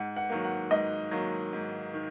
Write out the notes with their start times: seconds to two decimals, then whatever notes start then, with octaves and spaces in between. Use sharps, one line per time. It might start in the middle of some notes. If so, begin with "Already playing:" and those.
Already playing: G#2 F#5
0.16 F#5
0.30 D#3 F#3 A#3
0.44 F#5
0.71 G#2 D#5
1.11 D#3 F#3 A#3
1.53 G#2
1.94 D#3